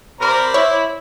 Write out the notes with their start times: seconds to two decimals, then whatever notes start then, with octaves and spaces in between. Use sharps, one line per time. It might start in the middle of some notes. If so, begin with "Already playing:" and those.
0.20 C3 A#4 C5 D5 B5
0.54 E4 C#5